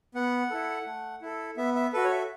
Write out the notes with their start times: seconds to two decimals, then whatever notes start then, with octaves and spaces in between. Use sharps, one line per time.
0.15 B3 F#5
0.50 E4 A4
0.86 A3
1.22 E4 A4
1.57 B3 E5
1.75 E5
1.93 F#4 A4 B4
2.04 C#5
2.11 E5